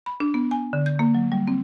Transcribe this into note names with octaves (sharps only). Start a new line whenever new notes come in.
B5
D4
B3
G#5
D3
G6
A#3
F#3
G3
C4